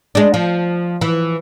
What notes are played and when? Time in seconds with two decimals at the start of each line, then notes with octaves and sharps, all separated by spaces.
0.15 G#3 D4
0.34 F3
1.01 E3